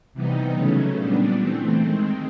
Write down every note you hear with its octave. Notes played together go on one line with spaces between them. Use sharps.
C3 E3 G3 B3 D#4
C#3 F#3 A3 C#4
A#2 G3 B3 D4
E3 A3 C4
D#3 G#3 C4